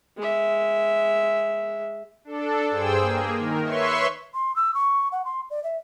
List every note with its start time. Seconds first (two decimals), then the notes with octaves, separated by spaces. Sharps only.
0.17 G#3 E5
2.25 D4 A4
2.70 G2 G#4 C5 G5 E6
3.00 A#3 G#4
3.35 D#3 A#4
3.64 B4 C#5 E5 C6 C#6
4.34 C6
4.56 E6
4.75 C#6
5.12 F#5
5.25 C6
5.50 D5
5.64 E5